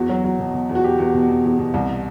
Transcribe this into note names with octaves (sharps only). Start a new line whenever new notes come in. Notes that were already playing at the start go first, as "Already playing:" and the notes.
Already playing: E2 F#4
F#3
F#3
B2
B2
E2
F#4
E2 G4
E2
B2
E2
E2
B2
C2